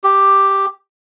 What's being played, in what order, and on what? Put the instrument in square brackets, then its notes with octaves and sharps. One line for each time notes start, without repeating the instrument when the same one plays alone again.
[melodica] G4